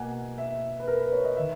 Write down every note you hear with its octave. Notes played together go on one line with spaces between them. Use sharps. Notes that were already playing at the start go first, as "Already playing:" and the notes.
Already playing: B2 A#3 F#5 G#5 A#5
E5
B4
A#4
B4
C#5
D#5
D#3 E5